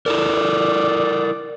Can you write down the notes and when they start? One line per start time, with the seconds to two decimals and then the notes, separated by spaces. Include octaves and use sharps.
0.06 E4 A4 A#4 D5